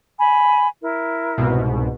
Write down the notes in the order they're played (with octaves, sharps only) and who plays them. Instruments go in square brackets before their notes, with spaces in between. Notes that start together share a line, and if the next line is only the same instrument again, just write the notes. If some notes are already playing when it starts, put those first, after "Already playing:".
[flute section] G#5 B5
E4 A#4
[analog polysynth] C2 G#2 B2